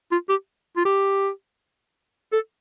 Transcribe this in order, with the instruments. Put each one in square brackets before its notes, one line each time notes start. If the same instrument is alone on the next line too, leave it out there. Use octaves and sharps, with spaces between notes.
[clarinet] F4
G4
F4
G4
A4